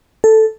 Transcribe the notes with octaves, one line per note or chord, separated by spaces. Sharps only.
A4